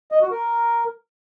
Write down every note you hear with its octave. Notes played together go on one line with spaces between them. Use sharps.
D#5
F#4
A#4